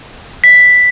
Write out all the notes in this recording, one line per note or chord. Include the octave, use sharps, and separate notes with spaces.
B6